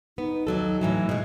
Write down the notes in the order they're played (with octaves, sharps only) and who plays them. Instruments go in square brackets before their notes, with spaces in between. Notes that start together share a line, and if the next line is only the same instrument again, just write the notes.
[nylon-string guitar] B3 [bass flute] D#4
[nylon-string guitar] D#2 F#3 A4
A2 E3 F#3
B2 G#3